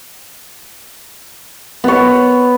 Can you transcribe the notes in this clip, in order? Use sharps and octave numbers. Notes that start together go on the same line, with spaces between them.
B3 C#5